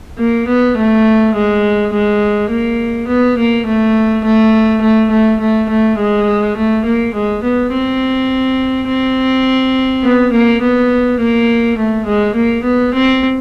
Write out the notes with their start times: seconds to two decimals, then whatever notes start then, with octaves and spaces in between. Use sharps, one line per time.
0.18 A#3
0.47 B3
0.77 A3
1.35 G#3
1.93 G#3
2.50 A#3
3.08 B3
3.38 A#3
3.66 A3
4.24 A3
4.81 A3
5.10 A3
5.40 A3
5.69 A3
5.98 G#3
6.56 A3
6.85 A#3
7.14 G#3
7.43 B3
7.72 C4
8.88 C4
10.04 B3
10.32 A#3
10.62 B3
11.20 A#3
11.77 A3
12.06 G#3
12.35 A#3
12.64 B3
12.94 C4